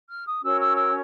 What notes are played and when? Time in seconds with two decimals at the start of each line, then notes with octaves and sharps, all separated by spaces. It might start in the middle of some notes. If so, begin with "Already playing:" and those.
0.09 F6
0.26 D#6
0.43 C#4 F#4 A#4 C#5 E6
0.60 E6
0.77 E6